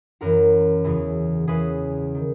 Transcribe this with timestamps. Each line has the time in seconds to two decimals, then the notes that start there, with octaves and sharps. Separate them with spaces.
0.21 F#2 E3 F#4 A#4
0.84 E2 C#3 E3
1.48 E2 C#3 E3 G#4 B4
2.15 D#3